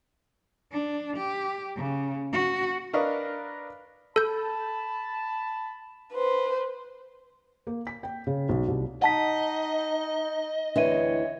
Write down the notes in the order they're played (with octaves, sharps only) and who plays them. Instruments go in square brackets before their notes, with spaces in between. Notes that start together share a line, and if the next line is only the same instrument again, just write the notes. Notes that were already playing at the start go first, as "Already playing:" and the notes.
[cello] D4
G4
C#3
F#4
[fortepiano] D4 A#4 B4 D#5 F5 C#6
[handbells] A4 G6 [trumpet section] A5 B5
[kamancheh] B4 C5
[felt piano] A#3
B6
G5
C#3
B1
C2
[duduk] D#4 [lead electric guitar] D#5 [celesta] F#5 A5 B6
[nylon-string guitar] D2 E3 C4 [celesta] D4 E5 D#7 [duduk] C#5